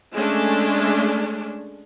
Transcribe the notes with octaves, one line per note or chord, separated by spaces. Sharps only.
G#3 A3 C#4 D4